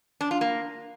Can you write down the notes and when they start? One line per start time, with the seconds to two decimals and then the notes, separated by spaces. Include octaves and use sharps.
0.21 D4
0.31 F4
0.41 A#3